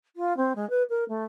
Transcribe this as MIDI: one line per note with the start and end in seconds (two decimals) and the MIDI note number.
0.16 0.36 65
0.37 0.53 60
0.55 0.68 56
0.70 0.83 71
0.89 1.04 70
1.08 1.24 57